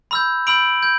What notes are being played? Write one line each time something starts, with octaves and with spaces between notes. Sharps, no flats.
B5 E6 G6
B5 E6 G6 D7 F#7
G6